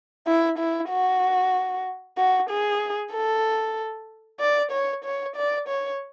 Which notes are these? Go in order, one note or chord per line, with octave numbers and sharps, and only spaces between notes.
E4
E4
F#4
F#4
G#4
A4
D5
C#5
C#5
D5
C#5